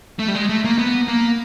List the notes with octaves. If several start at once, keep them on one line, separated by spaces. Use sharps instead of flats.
A3
G3
G#3
A3
A#3
B3
A#3